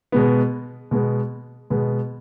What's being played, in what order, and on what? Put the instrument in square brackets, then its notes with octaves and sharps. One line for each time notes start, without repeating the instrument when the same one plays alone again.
[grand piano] B2 G#3 B3
B2 G#3 B3
B2 G#3 B3